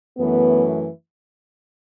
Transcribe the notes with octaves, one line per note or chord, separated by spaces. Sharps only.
F#2 E3 A3 B3